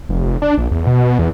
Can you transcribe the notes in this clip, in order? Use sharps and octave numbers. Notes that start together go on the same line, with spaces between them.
F1
D4
A#1
E2
B2
E2